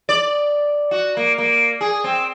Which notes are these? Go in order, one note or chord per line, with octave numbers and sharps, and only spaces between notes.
D5
F#4
A#3
A#3
G#4
C4